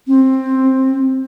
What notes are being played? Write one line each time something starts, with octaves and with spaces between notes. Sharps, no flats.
C4